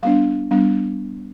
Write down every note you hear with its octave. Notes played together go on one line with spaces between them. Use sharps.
G3 B3 D4 F5
G3 B3 D4